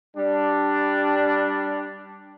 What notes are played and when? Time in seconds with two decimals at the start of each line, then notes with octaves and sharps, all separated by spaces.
0.16 G3 D4